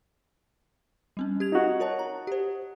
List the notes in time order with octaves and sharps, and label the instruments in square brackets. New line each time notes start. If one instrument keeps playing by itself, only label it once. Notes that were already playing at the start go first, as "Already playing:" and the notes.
[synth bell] G3 C4 C#4
G4 G#6 F7
[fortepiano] D#4 F#4
[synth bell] A#4 C#5 A5
A#5
G4 C5